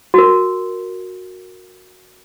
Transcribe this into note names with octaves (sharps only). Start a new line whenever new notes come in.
F#4 A#4